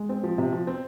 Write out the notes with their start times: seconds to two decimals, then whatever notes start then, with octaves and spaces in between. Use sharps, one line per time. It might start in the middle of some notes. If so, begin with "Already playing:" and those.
Already playing: G#3
0.09 C4
0.23 F3
0.38 C3
0.52 F3
0.67 C4